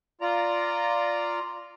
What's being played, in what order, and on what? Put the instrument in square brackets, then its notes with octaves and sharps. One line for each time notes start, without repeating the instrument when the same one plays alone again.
[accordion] F4 D5 A#5